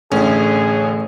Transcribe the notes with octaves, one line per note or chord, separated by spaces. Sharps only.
A1 A2 D3 C#4 G#4